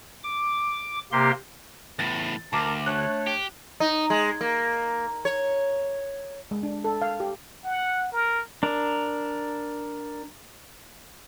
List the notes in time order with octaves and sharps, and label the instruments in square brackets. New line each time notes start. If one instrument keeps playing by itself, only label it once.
[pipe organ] D6
C3 A#3 G4 C6
[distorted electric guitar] E2 A2 [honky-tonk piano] A6
[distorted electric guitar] D2 [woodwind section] A#4 A5 A#5 [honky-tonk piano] D6
[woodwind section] A3 D4 C#5 [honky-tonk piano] F#6
[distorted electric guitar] G4
[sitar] D#4
G#3
A#3
C#5
[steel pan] G#3
D4
A4
F5
G4
[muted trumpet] F#5
A#4
[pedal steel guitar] D4 A#4